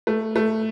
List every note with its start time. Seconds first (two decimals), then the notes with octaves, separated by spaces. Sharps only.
0.07 A3
0.36 A3